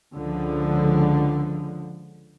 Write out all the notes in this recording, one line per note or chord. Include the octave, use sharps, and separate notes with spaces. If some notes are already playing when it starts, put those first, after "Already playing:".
C#2 D3 F3